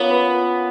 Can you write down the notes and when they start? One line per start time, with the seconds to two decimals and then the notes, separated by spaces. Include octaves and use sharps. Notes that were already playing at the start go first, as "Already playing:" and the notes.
Already playing: A#3 B3 C#4 F4
0.10 B4